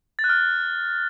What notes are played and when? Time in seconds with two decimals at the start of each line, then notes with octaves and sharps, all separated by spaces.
0.19 A6
0.24 F#6
0.29 F6